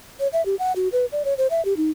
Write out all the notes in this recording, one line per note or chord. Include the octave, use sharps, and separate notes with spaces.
C#5
E5
G4
F#5
F#4
B4
D5
C#5
C5
E5
G4
D#4